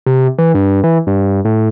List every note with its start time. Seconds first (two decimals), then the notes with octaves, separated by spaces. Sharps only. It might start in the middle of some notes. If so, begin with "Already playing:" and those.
0.06 C3
0.38 E3
0.55 G2
0.84 E3
1.07 G2
1.45 A2